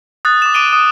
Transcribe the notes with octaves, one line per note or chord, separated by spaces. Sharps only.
D#6 F#6 A6
D6 E7
D6 D7 D#7 G7
D#6